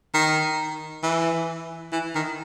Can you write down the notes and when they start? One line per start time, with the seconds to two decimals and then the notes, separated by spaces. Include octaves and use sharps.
0.14 D#3
1.03 E3
1.92 E3
2.15 D#3